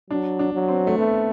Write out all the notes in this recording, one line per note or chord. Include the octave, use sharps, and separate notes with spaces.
F#3 D4
D4
F#3
C4
A3
A3 B3